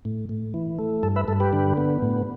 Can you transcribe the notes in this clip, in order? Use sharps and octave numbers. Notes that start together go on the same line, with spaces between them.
A2
A2
E3
A3
G2 A4
B4 E5
G2 A4
G4 B4
D3
B3
A2